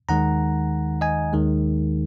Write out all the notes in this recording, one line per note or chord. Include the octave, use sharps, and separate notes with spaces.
D#2 D#3 G#3 F#5 A#5
D#5 G#5
D#2 D#3 G#3